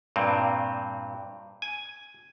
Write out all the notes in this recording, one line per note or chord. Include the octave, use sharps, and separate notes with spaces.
G2 A#2 C4
G#5